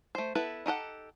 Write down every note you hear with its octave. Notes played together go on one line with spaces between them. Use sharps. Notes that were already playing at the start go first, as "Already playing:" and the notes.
A3 C5
B3 E4 A4 B4
D#4 G4 A4 F#5